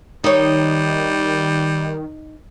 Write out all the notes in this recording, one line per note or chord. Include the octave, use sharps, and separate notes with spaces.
D#3 G3 D#4 C#5